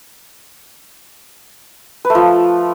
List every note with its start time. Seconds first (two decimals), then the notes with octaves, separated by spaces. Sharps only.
2.05 B4
2.10 A3
2.15 F3